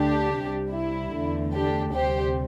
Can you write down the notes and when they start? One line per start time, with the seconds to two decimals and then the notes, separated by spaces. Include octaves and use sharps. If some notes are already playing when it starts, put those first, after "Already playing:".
Already playing: D2 D3 A3 D4 G4
0.33 C2 C3 G3
0.72 E4
1.13 E2 D3 A3
1.53 D4 G4
1.93 D2 C3 G3 G4 C5